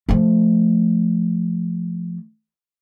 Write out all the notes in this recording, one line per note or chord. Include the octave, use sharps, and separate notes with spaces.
F3 A3